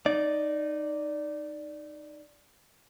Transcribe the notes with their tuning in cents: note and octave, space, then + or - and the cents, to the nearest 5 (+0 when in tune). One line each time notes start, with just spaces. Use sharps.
D#4 -15 D5 +0